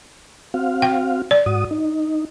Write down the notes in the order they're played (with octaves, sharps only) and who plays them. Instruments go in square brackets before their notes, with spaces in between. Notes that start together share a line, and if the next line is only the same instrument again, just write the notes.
[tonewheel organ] C4 F#4 F5
[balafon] G5
D5
[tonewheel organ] G#2 F#4 D#6
D#4